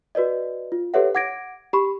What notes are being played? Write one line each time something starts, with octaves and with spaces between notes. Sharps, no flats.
F#4 B4 D5 D#5
F4
G4 A4 B4 C#5 E5 F#5
F#5 D6 G#6 A#6 D7
G4 B5 C#6